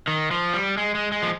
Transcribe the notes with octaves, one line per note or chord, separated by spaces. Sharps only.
D#3
F3
G3
G#3
G#3
G#3
F3